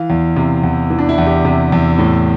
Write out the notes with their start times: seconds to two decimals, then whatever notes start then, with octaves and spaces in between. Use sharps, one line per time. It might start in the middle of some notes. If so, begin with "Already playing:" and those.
Already playing: E3 F5
0.10 E2
0.36 C3
0.63 E2
0.90 E3
0.99 D4
1.09 E4
1.18 E2
1.26 G4
1.45 C3 G4
1.72 E2
1.98 A2